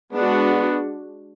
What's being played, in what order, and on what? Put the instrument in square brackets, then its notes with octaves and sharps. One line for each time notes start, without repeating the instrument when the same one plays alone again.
[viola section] G#3 D4 F#4 [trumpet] B3